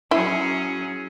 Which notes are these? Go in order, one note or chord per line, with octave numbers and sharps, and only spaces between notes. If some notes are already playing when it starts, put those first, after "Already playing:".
F#3 C#4 E4 G#4 E5